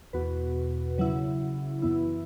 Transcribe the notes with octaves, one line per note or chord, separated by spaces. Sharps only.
E2 B2 B3 F#4 B4
C#3 F#3 E4
F#2 E3 B3 E4